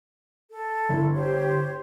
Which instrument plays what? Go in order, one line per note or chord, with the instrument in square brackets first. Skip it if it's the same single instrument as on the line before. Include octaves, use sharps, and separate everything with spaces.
[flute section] A4
[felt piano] G1 E4
[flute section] G4 C5 C#5